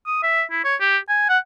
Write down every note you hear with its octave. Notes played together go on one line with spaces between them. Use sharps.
D#6
E5
E4
C#5
G4
G#5
F#5